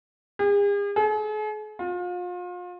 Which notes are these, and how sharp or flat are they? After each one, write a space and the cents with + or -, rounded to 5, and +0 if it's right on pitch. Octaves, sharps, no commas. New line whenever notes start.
G#4 -45
G#4 +45
F4 +35